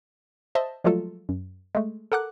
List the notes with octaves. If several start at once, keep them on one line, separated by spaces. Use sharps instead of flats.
C5 D#5 E5 A5
F3 F#3 G#3 A3 F4 A4
F#2
G#3 A3
A4 A#4 F#5 D6 F#6